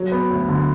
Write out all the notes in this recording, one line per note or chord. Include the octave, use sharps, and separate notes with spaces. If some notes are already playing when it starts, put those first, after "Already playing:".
Already playing: F#3
B3
D2
D3